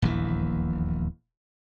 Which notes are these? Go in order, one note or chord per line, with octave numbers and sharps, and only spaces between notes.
D#1 A#1 E2 E3